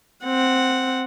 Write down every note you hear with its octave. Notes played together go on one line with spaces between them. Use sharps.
C4 F#5